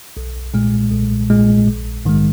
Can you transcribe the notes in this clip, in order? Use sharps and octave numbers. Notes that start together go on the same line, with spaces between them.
B1
A#2 G#3
B1
A#2 G#3
A#1
G#2 D#3 G#3